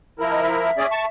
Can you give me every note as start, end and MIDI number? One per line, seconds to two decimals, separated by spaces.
0.19 0.71 53
0.19 0.71 64
0.19 0.71 70
0.31 0.43 75
0.44 1.09 76
0.78 0.86 61
0.78 0.86 68
0.78 0.86 74
0.91 1.05 81
0.91 1.05 85